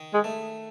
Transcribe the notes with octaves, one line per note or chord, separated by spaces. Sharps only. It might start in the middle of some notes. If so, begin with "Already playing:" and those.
Already playing: D#3
G#3
A3